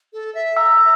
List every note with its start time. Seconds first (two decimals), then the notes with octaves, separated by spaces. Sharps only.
0.13 A4
0.35 E5
0.57 A#5 E6